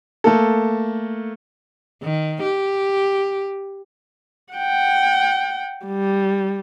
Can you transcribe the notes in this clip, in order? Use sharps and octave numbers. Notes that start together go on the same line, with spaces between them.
A3 A#3 A4
D#3
G4
F#5 G5
G3